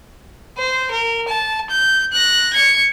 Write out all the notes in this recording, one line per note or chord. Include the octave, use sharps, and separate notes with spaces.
C5
A#4
A5
G6
F#6 A#6
G#6 C#7